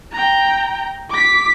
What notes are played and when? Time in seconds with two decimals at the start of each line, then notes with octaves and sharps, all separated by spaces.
0.12 G5 A#5
1.10 D6 B6